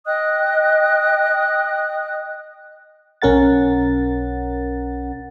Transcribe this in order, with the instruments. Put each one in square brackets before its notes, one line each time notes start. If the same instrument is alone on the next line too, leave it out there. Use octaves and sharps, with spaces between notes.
[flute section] D#5 G5 D#6 F#6
[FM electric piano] B1 C#4 A#4 F#5 A6